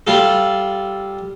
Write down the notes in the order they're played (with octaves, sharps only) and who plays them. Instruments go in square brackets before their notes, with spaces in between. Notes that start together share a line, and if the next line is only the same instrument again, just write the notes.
[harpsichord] G3 F4 A4